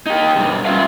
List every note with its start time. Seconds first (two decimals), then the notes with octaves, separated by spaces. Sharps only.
0.06 D#4 G4
0.36 G2 B2 G3
0.65 G#2 C#4 F4 E5 F5